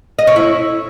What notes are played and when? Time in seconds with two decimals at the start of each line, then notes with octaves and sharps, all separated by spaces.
0.19 D#5
0.27 C#4
0.36 E4